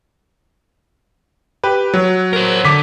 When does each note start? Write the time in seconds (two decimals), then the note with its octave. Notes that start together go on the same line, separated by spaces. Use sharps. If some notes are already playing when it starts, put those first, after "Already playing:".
1.64 G4 B4
1.94 F#3
2.33 A#4 C5
2.65 D3 D6 B6